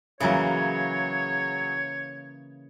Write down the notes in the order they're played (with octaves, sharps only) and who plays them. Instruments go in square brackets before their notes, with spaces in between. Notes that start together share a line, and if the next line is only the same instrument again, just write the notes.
[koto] C#3 E3 A#3 [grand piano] F#3 G#4 [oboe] C#5